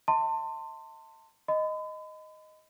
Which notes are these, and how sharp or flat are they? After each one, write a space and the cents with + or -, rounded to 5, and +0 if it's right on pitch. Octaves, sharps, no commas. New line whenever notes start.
E5 -40 A5 +35 C6 +0
D#5 +0 B5 +40